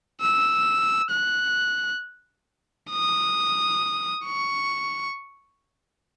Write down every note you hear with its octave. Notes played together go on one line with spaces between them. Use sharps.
E6
F#6
D#6
C#6